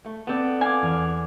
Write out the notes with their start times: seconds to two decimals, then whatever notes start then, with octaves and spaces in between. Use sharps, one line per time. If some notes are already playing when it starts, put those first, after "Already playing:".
0.06 A3
0.27 B3 C4 A4 D5
0.61 F5 G#5 D6
0.82 E2 F6